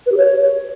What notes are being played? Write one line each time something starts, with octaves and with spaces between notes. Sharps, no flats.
B4
G4
C#5